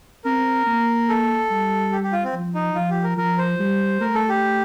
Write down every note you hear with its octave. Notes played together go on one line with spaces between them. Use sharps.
C4 A#4
A#3
A4
G3
G4
G4
F4
C4
F3
D#4
F3 F4
G4
A#4
F3 A#4
C5
G3
A3 A#4
A4
G4